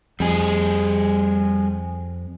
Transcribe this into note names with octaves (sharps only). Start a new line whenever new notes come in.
F2 G3 G#4